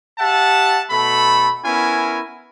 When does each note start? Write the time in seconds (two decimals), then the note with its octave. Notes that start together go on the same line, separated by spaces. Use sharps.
0.19 G4 E5 F#5 A5
0.90 B2 A3 A4 B5
1.65 B3 C#4 E4 A#4 G#5